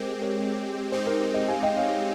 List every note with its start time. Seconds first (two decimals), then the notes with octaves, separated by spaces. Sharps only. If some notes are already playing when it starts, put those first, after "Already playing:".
Already playing: G#3 C4 G4 A#4 C5
0.22 A#4 C#5
0.92 G#3 C4 D#4 G4 C5
1.07 A#4
1.21 C5
1.34 C5 D#5
1.48 F5 G#5
1.63 D#5 G5
1.77 C#5 F5